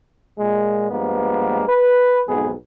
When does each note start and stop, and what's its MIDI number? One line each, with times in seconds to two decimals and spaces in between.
0.38 0.86 46
0.38 0.86 56
0.90 1.62 43
0.90 1.62 53
0.90 1.62 56
0.90 1.62 58
0.90 1.62 59
1.68 2.20 71
2.27 2.51 35
2.27 2.51 41
2.27 2.51 44
2.27 2.51 59
2.27 2.51 68